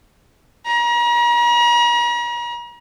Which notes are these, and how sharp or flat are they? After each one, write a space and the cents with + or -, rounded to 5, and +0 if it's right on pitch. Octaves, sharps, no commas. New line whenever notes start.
A#5 +40